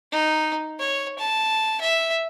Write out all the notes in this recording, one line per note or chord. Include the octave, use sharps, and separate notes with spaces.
D#4
C#5
A5
E5